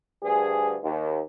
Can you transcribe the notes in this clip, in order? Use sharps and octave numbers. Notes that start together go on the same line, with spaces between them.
D2 G2 G#4
D#2